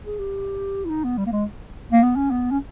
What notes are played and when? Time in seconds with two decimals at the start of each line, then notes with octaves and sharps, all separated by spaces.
0.06 G#4
0.19 G4
0.85 E4
0.90 D#4
1.04 B3
1.18 G3
1.26 A#3
1.32 G#3
1.92 A#3
2.03 B3
2.16 C#4
2.31 B3
2.51 C#4